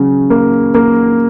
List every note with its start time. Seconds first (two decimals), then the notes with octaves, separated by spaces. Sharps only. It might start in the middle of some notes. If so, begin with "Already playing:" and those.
Already playing: C#3 F#3
0.30 A#3
0.74 A#3